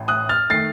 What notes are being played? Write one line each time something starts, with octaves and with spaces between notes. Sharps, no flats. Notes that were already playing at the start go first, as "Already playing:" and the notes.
Already playing: A1 A2
D#6 F#6
F6 A6
D#3 A3 A6 C7